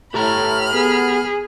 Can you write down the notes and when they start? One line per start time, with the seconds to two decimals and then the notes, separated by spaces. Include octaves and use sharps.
0.14 A2 G4 A4 A#5 B5 F6
0.74 B3 G#4